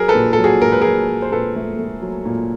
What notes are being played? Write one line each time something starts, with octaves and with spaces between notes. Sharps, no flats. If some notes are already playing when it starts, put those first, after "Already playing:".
Already playing: F#3 G#4 A#4
A4 B4
A#2
A4
F#3
F#4 G#4
A#2 A#4
B4
F#3 G#4 A#4
F#3
C5
A#2 A4 B4
A3
A3
F#3
A#2